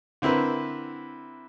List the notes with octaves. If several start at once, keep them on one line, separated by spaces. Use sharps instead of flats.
D3 C4 E4 A#4 B4